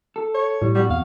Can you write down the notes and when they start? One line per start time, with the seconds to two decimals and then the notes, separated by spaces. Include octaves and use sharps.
0.16 A4
0.34 C#5
0.62 A2 G3
0.75 F2 G3 F#4
0.90 E2 F5